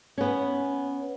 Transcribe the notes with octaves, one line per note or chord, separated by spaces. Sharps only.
B3 C#4